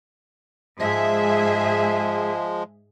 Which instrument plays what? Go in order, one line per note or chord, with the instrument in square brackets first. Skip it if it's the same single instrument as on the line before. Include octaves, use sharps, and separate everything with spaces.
[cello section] G#2 G#4 E5 [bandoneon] F3 G#3